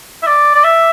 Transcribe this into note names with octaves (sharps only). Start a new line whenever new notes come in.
E5
D5
D5
E5